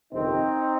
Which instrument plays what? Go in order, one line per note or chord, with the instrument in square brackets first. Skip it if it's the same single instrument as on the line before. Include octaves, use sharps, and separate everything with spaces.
[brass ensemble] G1 F2 C3 D#3 C4 D#4